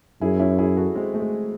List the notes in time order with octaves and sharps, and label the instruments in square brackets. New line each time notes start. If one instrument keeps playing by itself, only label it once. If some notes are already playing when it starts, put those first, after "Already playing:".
[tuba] F#2 [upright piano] E4 G#4
[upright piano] C#4 E4
E4 G#4
F#4 A4
G#3 C4
A3
G#3